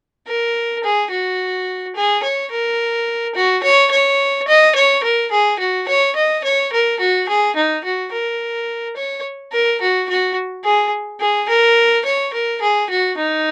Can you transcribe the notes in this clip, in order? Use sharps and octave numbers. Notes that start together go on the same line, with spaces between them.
A#4
G#4
F#4
G#4
C#5
A#4
F#4
C#5
C#5
D#5
C#5
A#4
G#4
F#4
C#5
D#5
C#5
A#4
F#4
G#4
D#4
F#4
A#4
C#5
A#4
F#4
F#4
G#4
G#4
A#4
C#5
A#4
G#4
F#4
D#4